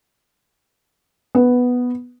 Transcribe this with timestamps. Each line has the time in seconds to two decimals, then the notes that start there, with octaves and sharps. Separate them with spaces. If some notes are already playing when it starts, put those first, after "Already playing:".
1.35 B3